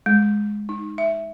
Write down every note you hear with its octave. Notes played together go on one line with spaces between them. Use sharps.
G#3
D#4
E5